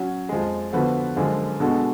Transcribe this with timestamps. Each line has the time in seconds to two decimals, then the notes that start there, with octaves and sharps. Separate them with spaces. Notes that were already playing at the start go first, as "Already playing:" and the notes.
Already playing: F#3 C#4 F#4
0.29 F2 F3 G#3
0.73 D3 F3 B3 F#4 B4
1.17 F#2 D3 F3 G#3
1.60 B2 G#3 D4 F#4 A4